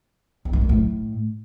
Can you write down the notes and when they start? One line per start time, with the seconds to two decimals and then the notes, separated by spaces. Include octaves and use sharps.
0.45 E2
0.53 G2
0.61 F#2
0.69 A2